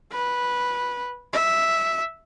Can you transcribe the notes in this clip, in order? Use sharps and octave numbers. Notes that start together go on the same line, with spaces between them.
B4
E5